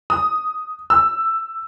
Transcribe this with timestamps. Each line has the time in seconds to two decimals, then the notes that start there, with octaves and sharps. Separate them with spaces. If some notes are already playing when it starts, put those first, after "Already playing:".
0.10 D#6
0.90 E6